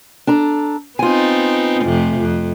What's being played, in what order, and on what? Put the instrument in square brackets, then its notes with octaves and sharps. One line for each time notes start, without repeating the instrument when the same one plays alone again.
[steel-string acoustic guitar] D4 A4 A#5
[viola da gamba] B3 C4 D#4 [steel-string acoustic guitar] F4 G#5
[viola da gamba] F2 C3 A3
F2